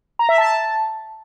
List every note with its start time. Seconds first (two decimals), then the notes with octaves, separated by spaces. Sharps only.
0.19 A#5
0.29 E5
0.38 A5